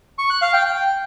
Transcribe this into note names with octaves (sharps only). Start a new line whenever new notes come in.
C#6
F#6
F5
G5
G5